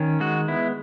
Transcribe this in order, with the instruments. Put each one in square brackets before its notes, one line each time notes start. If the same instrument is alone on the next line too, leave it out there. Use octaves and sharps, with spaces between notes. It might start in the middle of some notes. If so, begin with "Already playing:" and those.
Already playing: [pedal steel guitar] D#3 C#4
G#3 F#4
B3 E4